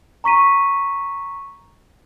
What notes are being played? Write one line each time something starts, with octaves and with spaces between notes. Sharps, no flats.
A#5 C#6 B6 D#7